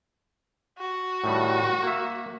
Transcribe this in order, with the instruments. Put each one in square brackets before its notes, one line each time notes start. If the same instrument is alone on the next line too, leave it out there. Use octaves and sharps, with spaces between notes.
[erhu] F#4
[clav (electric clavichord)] A2 D#3 G3
A#3 E5